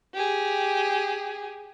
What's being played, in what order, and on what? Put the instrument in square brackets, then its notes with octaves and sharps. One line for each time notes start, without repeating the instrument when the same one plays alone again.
[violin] G4 G#4